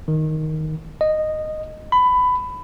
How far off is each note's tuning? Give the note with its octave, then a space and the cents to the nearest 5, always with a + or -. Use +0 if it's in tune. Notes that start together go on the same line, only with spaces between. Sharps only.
D#3 +5
D#5 -10
B5 +15